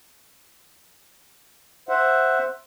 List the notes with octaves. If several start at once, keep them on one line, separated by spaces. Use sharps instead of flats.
C5 E5 F#5